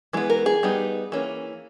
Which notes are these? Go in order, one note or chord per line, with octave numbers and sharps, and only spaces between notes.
E3 G#3 B3
A#4
G#4
G3 B3 D#4
E3 A#3 C#4